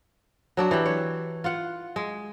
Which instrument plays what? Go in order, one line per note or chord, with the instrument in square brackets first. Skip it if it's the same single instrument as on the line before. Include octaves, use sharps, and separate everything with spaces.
[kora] F#3 D4 F#4
E3 G4
C#5
F4 F#5
G#3